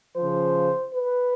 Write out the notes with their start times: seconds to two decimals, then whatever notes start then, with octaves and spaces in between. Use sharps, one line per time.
0.17 C#3 F3 C5
0.95 B4